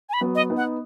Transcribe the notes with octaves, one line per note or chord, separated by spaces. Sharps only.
G#5
B5
F#3 B3
D#5
B3 D#4
F#5